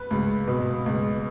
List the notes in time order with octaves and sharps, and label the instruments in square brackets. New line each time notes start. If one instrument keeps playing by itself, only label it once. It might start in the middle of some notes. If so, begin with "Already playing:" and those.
Already playing: [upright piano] B4
C#2
B2
C#2